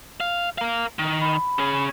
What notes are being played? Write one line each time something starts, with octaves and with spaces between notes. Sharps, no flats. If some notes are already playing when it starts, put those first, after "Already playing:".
F5
A#4 F5
D#3
B5
C#4 G#4